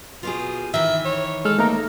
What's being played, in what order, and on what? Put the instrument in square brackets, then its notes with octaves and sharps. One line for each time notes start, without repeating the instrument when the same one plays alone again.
[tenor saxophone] B2 [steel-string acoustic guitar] F4 G4 G#4
[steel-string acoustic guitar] D#3 E3 [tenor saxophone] E5
[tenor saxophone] C#5
[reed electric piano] G#3 F6 [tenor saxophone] A4
[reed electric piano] A3 A#3 A#4 [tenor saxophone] D#4